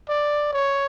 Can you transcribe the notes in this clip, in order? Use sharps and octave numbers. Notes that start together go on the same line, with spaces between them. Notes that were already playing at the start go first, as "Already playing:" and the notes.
D5
C#5